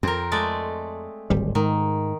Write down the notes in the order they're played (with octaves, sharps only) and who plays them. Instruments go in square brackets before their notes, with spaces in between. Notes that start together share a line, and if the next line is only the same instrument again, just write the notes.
[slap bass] F2 [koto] C4 A#4
[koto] G#3 A3 D5
[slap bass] D1 G#1 G3
[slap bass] G#2 [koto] D#3